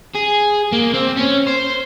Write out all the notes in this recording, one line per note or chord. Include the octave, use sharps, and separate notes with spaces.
G#4
A#3
C4
C#4
C5